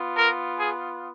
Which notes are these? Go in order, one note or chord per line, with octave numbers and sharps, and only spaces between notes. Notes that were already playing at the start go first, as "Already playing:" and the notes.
Already playing: B3 F4
A#4
G#4